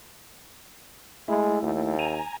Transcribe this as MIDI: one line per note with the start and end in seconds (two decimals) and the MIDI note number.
1.28 1.62 56
1.28 1.96 57
1.28 1.96 64
1.62 2.18 39
1.99 2.37 80
1.99 2.37 82